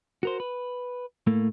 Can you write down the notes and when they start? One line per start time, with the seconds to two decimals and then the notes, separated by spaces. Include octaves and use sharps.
0.23 F#4 A#4 C5
0.40 B4
1.27 A2 A3 A#3